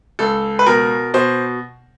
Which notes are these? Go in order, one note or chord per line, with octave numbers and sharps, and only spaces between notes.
C#2 A4
B4
B2 A#4
B2 C5